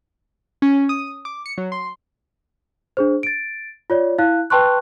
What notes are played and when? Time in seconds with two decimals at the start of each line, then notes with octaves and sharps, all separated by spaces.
0.62 C#4
0.89 D#6
1.25 D6
1.46 C#7
1.58 F#3
1.72 C6
2.97 D4 G#4 C5
3.23 A6 D7
3.90 F4 C#5 D5
4.18 E4 F5 F#6
4.50 B4 G5 A5 C6 C#6 F#6